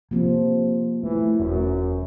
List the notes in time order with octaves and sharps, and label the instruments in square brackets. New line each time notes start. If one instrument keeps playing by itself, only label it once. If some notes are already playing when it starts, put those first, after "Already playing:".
[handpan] C3 F3 [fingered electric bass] A#3
[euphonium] E3 [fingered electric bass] A3
[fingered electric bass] E1 [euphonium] F#2